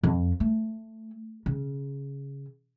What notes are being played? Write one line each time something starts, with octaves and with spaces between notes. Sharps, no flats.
F2
A3
C#3